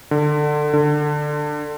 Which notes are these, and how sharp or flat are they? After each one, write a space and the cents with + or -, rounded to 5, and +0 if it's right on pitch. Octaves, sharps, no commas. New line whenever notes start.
D3 +20
D3 +15